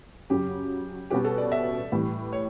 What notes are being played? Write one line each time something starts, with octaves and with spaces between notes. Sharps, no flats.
F#2 C#3 F#3 G4
B2 G3 C#4 F#4 G4 B4
A4
D5
E5
A2 E3 G3
C#5